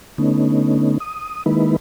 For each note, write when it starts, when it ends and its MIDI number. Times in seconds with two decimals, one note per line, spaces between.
0.18 0.98 50
0.18 0.98 57
0.18 0.98 59
0.18 0.98 61
0.18 0.98 63
1.00 1.44 87
1.46 1.76 51
1.46 1.76 56
1.46 1.76 58
1.46 1.76 63
1.46 1.76 64
1.46 1.76 71